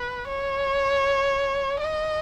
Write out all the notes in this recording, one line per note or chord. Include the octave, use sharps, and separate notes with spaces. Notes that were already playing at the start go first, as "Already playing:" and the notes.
Already playing: B4
C#5
D#5